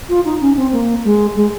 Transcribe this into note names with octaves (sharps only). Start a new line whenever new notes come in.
F4
D#4
C#4
C4
A#3
G#3
G#3